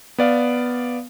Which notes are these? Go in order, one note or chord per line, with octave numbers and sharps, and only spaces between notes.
B3 D5 F5